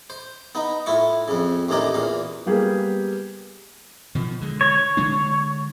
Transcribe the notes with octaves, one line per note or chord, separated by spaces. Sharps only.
C5
B3 D#4
A2 E4 F4 C#6
F2 C#3
A1 D#2 A2 C#4 D#4 D5
E2 A#2 F5
G3 A#3 B3 G4 G#4
B2 D#3 F3
D3 G#3
C#5
D3 G#3 D4